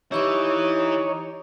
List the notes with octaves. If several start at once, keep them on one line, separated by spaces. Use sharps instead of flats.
E3 D#4 E4 G4 C#5 C#6 D6